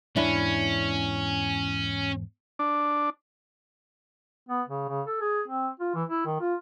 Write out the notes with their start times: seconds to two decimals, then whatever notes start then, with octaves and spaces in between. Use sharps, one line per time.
0.16 E2 G#2 C#4 D4 E4
2.59 D4
4.49 B3
4.67 C#3
4.89 C#3
5.07 A4
5.21 G#4
5.48 C4
5.80 F4
5.95 E3
6.09 E4
6.26 D#3
6.41 F4